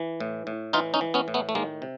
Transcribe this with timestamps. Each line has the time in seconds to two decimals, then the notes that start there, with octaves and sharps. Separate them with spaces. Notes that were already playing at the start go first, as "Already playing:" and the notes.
Already playing: E3
0.20 A2
0.47 A2
0.73 E3 D#4 F4
0.94 C#4 D#4
1.01 E3
1.14 B3 C#4
1.28 A2
1.34 A3 B3
1.49 A3
1.55 D#3 G#3 A#3
1.82 C3